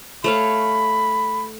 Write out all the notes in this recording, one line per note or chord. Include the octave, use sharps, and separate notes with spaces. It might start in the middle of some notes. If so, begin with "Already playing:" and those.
A3 C#5 F5 B5